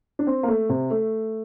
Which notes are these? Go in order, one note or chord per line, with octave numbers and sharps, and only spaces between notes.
D4
C4
A#3
A3
C3
A3